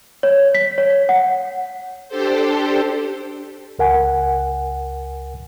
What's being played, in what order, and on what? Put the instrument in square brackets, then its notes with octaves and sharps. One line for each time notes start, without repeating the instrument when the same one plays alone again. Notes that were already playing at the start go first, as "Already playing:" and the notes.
[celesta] C#5
B6
C#5
F#5
[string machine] D4 G4 A4 C5
[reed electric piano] C#2 A#4 F#5 G#5